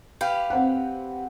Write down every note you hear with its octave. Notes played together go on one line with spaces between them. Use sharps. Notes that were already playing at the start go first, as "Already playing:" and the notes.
G4 B4 F5
C4 F#5